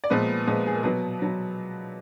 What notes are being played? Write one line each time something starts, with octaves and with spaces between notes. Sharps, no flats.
D5
A#2 F3 G#3 B3 B4
A#2 F3 G#3 B3
G#4
A#4
B2 F#3 B3 B4
B2 F#3 B3